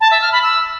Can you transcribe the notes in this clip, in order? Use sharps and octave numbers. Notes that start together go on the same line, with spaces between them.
A5
E5
F6
B5
E6